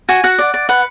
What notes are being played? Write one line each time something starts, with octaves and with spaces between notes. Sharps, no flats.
F#4 G#5
F#4 F#5
D5
D5
B4 F#5